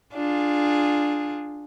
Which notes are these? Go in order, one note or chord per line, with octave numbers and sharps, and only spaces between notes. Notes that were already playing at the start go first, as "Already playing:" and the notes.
D4 F4 G#4